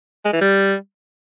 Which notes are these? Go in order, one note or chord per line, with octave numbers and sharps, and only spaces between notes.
G#3
E3
G3